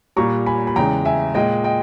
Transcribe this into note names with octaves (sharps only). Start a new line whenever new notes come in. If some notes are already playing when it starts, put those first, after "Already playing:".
A#2 G3 A#5 C#6
G#5 B5
B5
E2 C#3 G#3 G5 A#5
E5 G#5
A#2 G#3 D#5 G5
D#5 G5